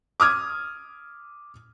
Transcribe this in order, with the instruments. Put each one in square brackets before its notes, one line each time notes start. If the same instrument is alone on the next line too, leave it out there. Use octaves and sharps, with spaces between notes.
[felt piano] D6 D#6 F6 G#6